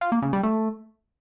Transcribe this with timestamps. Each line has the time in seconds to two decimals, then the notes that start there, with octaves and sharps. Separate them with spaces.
0.01 F4
0.12 A#3
0.22 C#3
0.33 G3
0.43 A3